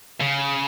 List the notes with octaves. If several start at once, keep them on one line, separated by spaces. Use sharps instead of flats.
C#3